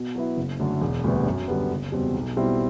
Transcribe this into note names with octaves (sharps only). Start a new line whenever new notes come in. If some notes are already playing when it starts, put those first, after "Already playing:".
Already playing: B2
F#3 B3 E4
F#1
F#2 D3 A3
E1
D2 C3 G3 B3
F#2
D3 G3 B3
F#1
E2 B2 G3 C4
B1
B2 G3 C4 E4